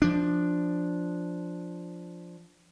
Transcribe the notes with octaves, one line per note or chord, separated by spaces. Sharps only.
F3 D4